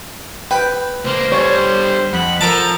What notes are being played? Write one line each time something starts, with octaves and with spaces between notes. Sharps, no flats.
B4 G5
C#2 A#3 C5
D3 G3 C#5
F2 F#5 B5
F3 A4 A#4 A5 A#5